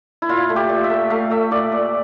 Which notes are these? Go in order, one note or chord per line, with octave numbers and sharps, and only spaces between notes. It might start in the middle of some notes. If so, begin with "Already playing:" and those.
E4
A#2 F4
A3
G4
A#2
E5
A3
A3 F5
A3 E5
A#2 D5
A#2